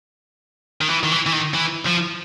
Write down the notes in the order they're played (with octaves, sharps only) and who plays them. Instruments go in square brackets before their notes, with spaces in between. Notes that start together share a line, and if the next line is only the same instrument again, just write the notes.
[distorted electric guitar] D#3
E3
D#3
E3
E3
D#3
E3
F3